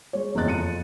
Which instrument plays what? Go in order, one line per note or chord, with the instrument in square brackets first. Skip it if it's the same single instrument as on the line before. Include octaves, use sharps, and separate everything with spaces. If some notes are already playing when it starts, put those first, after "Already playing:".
[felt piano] G#3 C#5
F#1 E2 D#5 F#6 A6
F2 F3 C#7 D#7